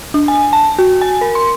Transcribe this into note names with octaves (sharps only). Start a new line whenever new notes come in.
D4
G#5
A5
F#4
G#5
A#4
C6